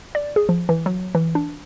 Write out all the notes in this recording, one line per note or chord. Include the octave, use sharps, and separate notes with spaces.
D5
G#4
F3
E3
F#3
E3
D4